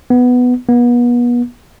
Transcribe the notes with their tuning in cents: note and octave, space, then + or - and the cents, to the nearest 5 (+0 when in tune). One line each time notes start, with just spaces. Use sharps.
B3 +5
B3 -35